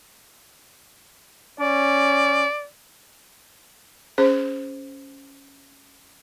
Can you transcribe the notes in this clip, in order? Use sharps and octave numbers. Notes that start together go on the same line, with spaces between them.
C#4 D5
C#4 G#4 C5